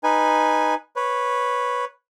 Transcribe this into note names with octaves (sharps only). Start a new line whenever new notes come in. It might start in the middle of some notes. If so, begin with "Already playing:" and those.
D#4 B4 G#5
B4 C#5